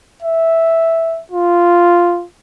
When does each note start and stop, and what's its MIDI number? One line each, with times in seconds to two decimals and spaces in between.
0.23 1.21 76
1.32 2.25 65